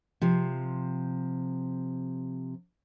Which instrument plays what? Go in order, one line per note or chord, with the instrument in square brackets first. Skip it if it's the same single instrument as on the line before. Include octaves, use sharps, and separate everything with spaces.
[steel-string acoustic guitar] C3 F3